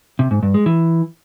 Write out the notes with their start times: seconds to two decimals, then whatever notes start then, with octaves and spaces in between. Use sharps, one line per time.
0.19 C3
0.31 G#2
0.43 G2
0.54 G#3
0.66 E3